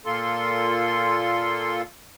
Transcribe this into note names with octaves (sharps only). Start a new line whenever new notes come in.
A#2 A#3 F4 A4 C6